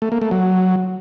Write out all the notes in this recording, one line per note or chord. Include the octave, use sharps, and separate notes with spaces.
A3
A#3
A3
F#3